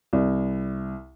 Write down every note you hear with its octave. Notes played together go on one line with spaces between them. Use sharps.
C2